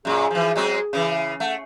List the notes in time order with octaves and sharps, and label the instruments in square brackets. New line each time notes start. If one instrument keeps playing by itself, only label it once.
[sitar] F#2 A#2 [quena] G#4
[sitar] E3 F3
F#3 G#3 C4
C#3 E3
[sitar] A3 [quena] F#5